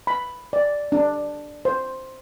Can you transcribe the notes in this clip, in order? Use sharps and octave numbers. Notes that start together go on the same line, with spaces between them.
B5
D5
D4
C5